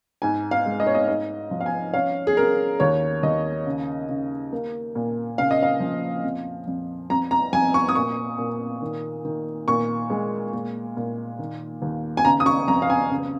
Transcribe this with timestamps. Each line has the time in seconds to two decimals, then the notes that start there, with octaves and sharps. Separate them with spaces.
0.22 G#2 G#5
0.51 F5
0.66 G#3
0.80 D#5
0.87 C#5
0.95 D#5
1.08 G#2 D#5
1.51 F3
1.61 F5
1.66 G#5
1.94 C#4 F5
2.27 G#4
2.37 C#4 A#4
2.80 D#2 C#5
3.23 D#2 D#5
3.66 C#3
4.09 C#3
4.52 A#3
4.95 A#2
5.38 C#3 F5
5.51 D#5
5.63 F5
5.80 F3
6.24 F2
6.67 F2
7.10 F2 A#5
7.31 A#5
7.53 F2 G#5
7.74 C#6
7.89 D#6
7.95 A#2 C#6
8.38 A#2
8.82 D#3
9.25 D#3
9.68 A#2 C#6
10.10 G#3
10.53 A#2
10.97 A#2
11.39 D#3
11.82 D#2
12.17 G#5
12.25 C#3 A#5
12.40 D#6
12.46 C#6
12.68 F2 A#5
12.82 F5
12.90 G#5
13.11 C#2